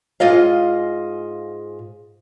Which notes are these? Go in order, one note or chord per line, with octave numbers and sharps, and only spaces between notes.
G#2 F4 D#5 F5